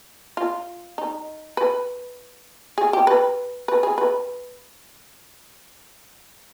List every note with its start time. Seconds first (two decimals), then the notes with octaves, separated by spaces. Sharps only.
0.37 F4
0.98 D#4
1.57 B4
2.78 G#4
2.93 G4
3.07 B4
3.68 B4
3.83 G#4
3.98 B4